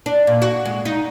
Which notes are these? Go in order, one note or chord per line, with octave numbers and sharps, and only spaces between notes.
D4
A#2
F#4
G#3
D#4